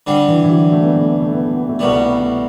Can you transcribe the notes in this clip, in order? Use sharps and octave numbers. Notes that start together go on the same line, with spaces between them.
D3 G3 C4
E3
E3
F#3
A3
B3
A3
B3
A3
B3
A3
B3
A3
C2 B2 G3 B3
A3
B3
A3